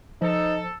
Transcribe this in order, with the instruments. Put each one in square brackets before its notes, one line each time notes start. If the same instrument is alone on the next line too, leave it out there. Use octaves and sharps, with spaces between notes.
[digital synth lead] F3 [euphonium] D#4 [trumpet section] A4